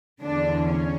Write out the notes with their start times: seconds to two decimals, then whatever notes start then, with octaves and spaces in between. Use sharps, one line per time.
0.22 E2 D3 D4
0.67 C#4